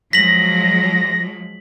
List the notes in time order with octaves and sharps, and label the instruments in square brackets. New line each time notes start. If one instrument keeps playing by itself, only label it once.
[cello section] F3 F#3 G#3 [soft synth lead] A#6 [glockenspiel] B6 F#7